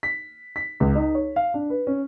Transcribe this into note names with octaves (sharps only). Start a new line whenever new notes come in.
B6
B6
C#2
D#4
C#5
F5
D4
B4
C#4